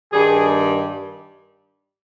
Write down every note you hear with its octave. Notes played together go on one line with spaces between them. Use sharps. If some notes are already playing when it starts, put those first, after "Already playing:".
G2 D#3 G3 G#4